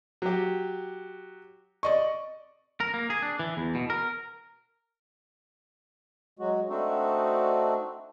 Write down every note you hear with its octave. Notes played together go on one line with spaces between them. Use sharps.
F#3 G4
D5 D#5 C#6
A#4
A#3
G#4
D4
E3
E2
B2
A#4
F#3 G#3 F#4
A3 C4 D4 D#4 F#4 A4